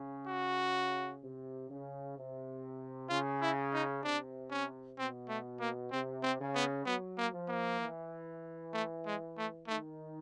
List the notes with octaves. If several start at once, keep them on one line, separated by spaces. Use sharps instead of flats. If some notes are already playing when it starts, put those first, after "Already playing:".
Already playing: C#3
F#4
C3
C#3
C3
C#3 F4
E4
D#4
C3 D4
C#4
B2 C4
A3
A#3
C3 C4
C4
C#3
B3
F#3 B3
A#3
F3
A#3
E3
A3
G#3
A3
D#3 A3